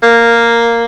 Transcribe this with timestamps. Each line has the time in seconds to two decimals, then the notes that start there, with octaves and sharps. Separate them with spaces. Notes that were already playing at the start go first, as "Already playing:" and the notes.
0.03 A#3